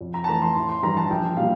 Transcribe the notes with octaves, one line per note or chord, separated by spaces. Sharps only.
F2
A#5
A5
E3 A3 A#5
C6
A1 C6
C6
G2 E3 G3 A#5
A5
A#1 G5
A#2 G3 F5